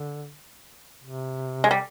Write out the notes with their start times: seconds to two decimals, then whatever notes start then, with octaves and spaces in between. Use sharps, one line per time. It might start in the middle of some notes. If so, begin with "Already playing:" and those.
Already playing: D3
1.03 C3
1.64 G#3
1.71 G3